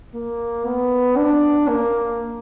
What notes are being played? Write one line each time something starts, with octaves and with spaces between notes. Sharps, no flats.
A#3
B3
D4
A#3